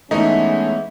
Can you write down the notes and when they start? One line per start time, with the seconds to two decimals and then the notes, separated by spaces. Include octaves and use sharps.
0.11 E3 G#3 A3 B3 C#4 D#4 E5